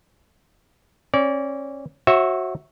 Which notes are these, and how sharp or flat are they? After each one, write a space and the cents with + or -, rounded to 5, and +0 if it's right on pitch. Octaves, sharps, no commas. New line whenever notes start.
C#4 -30 D5 -30
F#4 +0 C#5 -45 E5 -10